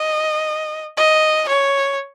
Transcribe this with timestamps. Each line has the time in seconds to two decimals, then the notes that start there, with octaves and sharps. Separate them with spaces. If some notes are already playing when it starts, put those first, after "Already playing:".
Already playing: D#5
0.97 D#5
1.49 C#5